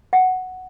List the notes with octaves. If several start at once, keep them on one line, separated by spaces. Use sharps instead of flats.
F#5